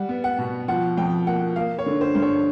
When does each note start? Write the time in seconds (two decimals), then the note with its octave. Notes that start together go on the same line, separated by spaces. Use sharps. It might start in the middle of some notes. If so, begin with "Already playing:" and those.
Already playing: G3 F#5
0.09 B3
0.24 F#5
0.39 B2
0.68 F3 F#5
0.97 F2 G5
1.27 A#3 F#5
1.56 A#3 F5
1.79 C#5
1.86 D3
2.01 C5
2.15 G2
2.22 C#5